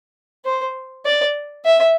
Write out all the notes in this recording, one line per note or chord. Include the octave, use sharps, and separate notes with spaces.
C5
D5
E5